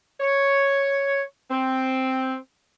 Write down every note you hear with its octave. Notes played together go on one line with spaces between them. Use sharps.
C#5
C4